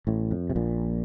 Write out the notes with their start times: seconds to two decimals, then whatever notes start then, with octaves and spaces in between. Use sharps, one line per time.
0.07 A1 A2
0.31 F2
0.50 C3
0.56 A#1 A#2